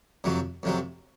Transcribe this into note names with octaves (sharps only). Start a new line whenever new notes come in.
F2 C3 F#3
F2 C3 F#3